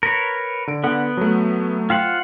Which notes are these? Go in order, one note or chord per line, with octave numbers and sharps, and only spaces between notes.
A#4 B4 C#5
D3 D7
D3 B3 F#5 F#6
F#3 A3
F4 C5 F#5 G5